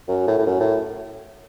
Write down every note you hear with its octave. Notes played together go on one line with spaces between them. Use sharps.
F#2
A2
A2
F#2
A2